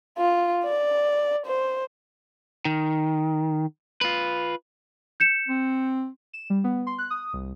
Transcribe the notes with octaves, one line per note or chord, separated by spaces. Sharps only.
F4
D5
C5
D#3
F4 B4
G6 C#7 E7
C4
E7
G3
B3
C6
F#6
D#6
C2